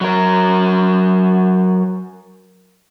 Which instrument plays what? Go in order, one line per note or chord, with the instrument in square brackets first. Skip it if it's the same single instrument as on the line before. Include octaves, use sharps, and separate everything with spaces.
[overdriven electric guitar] F#3 A#4